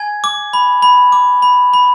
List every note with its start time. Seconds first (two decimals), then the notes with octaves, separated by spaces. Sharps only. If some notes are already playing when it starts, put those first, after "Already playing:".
Already playing: G#5 G#6
0.24 D6
0.53 B5
0.82 B5
1.12 D6
1.42 B5
1.74 B5